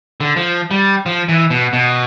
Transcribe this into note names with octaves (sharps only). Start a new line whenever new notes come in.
D3
F3
G3
F3
E3
B2
B2